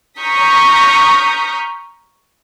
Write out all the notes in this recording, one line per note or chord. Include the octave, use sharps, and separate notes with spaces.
A#5 C#6 D#6 F6 G6 B6